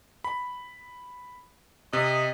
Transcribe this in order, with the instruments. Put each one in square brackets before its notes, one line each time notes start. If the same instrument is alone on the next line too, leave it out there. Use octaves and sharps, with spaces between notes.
[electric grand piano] B5
[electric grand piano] C3 [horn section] D#5